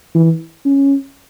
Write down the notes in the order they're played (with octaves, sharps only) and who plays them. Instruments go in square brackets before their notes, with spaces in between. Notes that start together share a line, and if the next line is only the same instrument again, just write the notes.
[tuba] E3
C#4